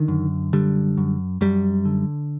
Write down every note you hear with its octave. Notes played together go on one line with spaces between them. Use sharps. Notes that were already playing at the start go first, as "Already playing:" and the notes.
Already playing: D3 D#3
F#2
D3 G3
F#2
F#2 G3
D3